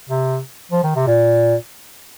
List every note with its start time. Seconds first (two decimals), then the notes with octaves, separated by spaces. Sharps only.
0.09 C3
0.71 F3
0.83 D#3
0.96 C3
1.07 A#2